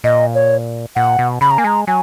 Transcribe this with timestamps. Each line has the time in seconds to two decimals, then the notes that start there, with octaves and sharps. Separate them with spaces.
0.04 A#2 D#5
0.35 C#5
0.96 A#2 F#5
1.19 B2
1.41 C#3 B5
1.51 A#5
1.58 A#3 G#5
1.64 G#3 A#5
1.87 F#3 G#5